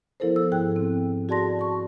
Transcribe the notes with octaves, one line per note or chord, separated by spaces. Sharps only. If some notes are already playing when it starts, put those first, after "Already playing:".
F3 B3 E4 A4 A#4 C5
E6
G#2 G#4 G5 F#6
C4
F#4 G#4 D5 A5 C6 A#6
A5 C#6